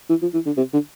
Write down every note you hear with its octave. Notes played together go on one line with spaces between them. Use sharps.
E3
F3
E3
D3
C3
D3